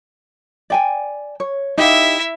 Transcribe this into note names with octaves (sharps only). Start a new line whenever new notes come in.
D5 G5 G#5
C#5
D#4 E4 G4 E5 F5